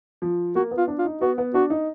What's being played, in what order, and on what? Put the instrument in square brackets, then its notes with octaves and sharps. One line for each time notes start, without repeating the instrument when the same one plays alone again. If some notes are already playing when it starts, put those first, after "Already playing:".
[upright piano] F3
[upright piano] A#3 [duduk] F#4
[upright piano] B3
[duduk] F4
[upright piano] D4
[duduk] F4
[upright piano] D#4
[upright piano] B3 [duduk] F#4
[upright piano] B3
[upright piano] D4 [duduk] F#4
[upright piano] D#4